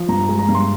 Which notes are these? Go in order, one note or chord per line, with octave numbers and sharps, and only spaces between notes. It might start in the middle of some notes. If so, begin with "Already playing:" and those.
Already playing: F3
G2 A#5
A#5
G#3
A#5
G2
C6